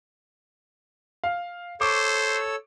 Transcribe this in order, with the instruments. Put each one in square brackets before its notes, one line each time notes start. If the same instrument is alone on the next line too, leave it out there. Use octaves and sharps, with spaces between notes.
[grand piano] F5
[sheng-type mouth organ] A4 C#5 E6 [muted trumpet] C5 [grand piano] C#6 D6